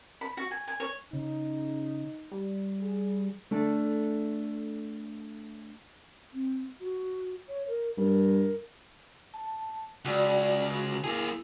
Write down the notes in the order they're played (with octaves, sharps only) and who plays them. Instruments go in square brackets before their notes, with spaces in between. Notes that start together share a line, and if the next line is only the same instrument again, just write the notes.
[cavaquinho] B5
F#4
G#5
G#5
C#5
[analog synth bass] C#3 [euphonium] D#4
[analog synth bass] G3
[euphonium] G#4
[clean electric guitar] A3 D4 A4
[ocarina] C4
F#4
C#5
A#4
[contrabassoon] G2 [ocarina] A#4
[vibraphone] A5
[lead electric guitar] C#2 [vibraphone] F#4 D5
[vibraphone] F#4
[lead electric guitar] A#3 G#4 [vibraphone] E4